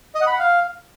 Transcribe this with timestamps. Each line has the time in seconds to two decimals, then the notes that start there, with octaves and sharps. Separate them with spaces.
0.15 D#5
0.21 F#5
0.27 B5
0.33 F#5
0.39 F5